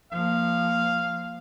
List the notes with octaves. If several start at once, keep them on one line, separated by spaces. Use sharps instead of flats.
F3 A#3 F5